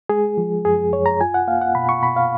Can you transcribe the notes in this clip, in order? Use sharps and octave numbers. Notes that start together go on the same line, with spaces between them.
G#3 G#4
F3
F#2 G#4
F#2 C#5
A#5
F4 G#5
F#5
A#3 F5
F#5
B2 B5
C#6
B2 B5
F5